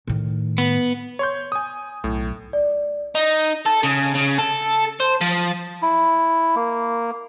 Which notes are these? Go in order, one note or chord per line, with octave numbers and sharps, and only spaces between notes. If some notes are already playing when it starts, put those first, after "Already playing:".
A2 D#3
B3
C#5 C6 G6
G#5 D#6
B1 A2
D5
D#4
A4
C#3
C#3
A4
C5
F3
E4
A#3